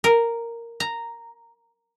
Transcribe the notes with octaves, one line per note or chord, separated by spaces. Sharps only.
A#4
A#5